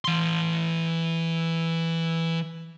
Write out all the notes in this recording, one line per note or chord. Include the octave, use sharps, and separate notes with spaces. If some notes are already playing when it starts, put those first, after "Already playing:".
E3 C6